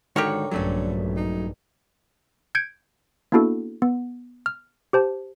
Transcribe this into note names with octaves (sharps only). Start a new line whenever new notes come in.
G#2 D3 D#3 F#4 G4 A#4 C#5
A#1 G2 D3 F#3 A3 C#4
D#4
G6 G#6 C#7 D7
A#3 B3 D4 E4 F#4 A4
B3
F6
G4 C5 A5